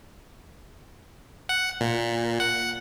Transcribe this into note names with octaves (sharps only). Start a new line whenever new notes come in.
F#5
A#2
F#5